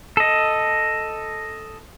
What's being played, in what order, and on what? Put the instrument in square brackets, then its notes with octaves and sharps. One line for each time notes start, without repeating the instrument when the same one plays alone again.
[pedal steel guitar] A4 D#5